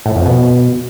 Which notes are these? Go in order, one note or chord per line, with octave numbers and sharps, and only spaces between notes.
A2
F2
B2